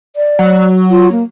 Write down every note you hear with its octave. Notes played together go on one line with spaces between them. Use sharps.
D5
F#3
F4
A#3